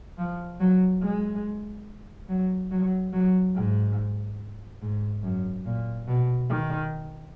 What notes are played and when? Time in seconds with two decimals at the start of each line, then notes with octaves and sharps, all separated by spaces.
0.18 F3
0.60 F#3
1.02 G#3
2.29 F#3
2.71 F#3
3.13 F#3
3.55 G#2
4.82 G#2
5.23 F#2
5.66 A#2
6.08 B2
6.50 D#3